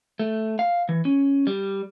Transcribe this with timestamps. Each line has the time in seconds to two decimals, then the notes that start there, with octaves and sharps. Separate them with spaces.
0.20 A3
0.59 F5
0.89 E3
1.05 C#4
1.47 G3